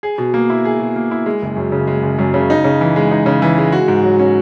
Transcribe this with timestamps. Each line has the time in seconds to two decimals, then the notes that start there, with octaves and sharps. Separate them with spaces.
0.03 G#4
0.18 B2
0.34 A#3
0.50 E4
0.65 G#4
0.79 B2
0.96 A#3
1.11 E4
1.26 G#3
1.42 F#1
1.57 F#2
1.72 C#3
1.87 G#3
2.03 F#1
2.19 F#2
2.34 C#3
2.50 D#4
2.64 C#3
2.81 E3
2.96 G#3
3.11 D#4
3.26 C#3
3.42 E3
3.58 G#3
3.72 F#4
3.88 G#2
4.04 F#3
4.19 C#4